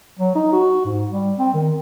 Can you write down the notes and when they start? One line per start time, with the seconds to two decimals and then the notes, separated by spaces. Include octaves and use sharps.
0.20 F#3
0.35 D#4
0.52 F#4
0.85 G#2
1.09 G3
1.38 C4
1.54 D#3